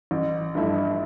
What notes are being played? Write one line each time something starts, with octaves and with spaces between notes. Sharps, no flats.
A1
G2 F3 A3 E4